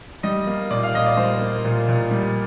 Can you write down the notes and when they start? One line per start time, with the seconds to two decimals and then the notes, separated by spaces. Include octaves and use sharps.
0.23 G3 D#5
0.47 A#3
0.70 A#2 D5
0.83 F5
0.94 A#2 D#5
1.06 D5
1.17 G3 C5
1.41 A#3
1.65 A#2
1.88 A#2
2.11 G3